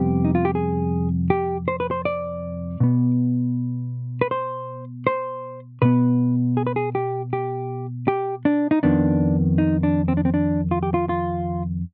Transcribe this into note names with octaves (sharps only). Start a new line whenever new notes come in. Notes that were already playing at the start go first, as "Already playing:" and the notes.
Already playing: F2 C3 G3 B3 G4
D#4
F4
G4
G#4
G4
C5
B4
C5
D5
B2 B3
B4
C5
C5
B2 B3 B4
G#4
B4
G#4
G4
G4
G4
D4
D#4
F2 D#3 B3 D4
D#4
D4
C4
D4
C4
D4
F4
G4
F4
F4